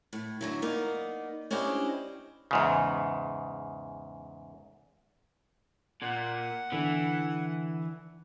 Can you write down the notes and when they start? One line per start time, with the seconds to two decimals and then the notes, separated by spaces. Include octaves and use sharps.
0.13 A2
0.41 D3 F#3 E4
0.62 A#3 B3 D#4 D5
1.51 C#4 D4 E4 G4 C5 D#5
2.51 E2 G#2 C#3
6.02 A#2 F#5
6.72 D3 E3